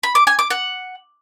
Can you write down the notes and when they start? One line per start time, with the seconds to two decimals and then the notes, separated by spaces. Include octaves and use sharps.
0.03 B5
0.15 D6
0.27 G#5
0.39 D6
0.50 F#5